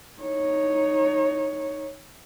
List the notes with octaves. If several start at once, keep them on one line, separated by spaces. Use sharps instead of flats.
D#4 C#5